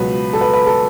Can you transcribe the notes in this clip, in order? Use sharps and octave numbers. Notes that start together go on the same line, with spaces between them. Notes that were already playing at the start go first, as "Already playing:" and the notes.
Already playing: C#2 B2 F#3 B4
A4
B4
B4
A4